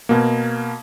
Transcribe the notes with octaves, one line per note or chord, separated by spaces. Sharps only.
B2 A#3